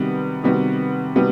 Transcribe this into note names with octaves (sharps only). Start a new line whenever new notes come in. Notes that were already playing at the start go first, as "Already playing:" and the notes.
Already playing: C3 D#3 G3 B3 F#4
C3 D#3 G3 B3 F#4
C3 D#3 G3 B3 F#4